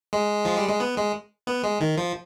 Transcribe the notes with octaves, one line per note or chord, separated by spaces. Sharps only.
G#3
F3
G3
G#3
B3
G#3
B3
G#3
D#3
F3